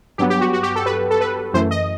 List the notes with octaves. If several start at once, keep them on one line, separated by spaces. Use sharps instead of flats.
G2 F#3 B3 G4
G4
F#4
F#4
G4
A4
B4
A4
B4
F#2 E3 A3 C5
D#5